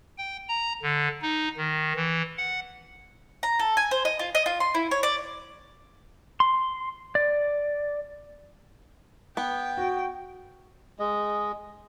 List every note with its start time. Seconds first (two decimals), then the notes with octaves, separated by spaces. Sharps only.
0.18 G5
0.49 A#5
0.83 D3
1.22 D#4
1.57 D#3
1.96 E3
2.38 F#5
3.43 A#5
3.60 A4
3.77 G#5
3.91 C5
4.05 D#5
4.19 F4
4.35 D#5
4.46 F4
4.60 C6
4.75 E4
4.91 C#5
5.03 D5
6.40 C6
7.15 D5
9.37 B3 G5
9.77 F#4
10.99 G#3 D#5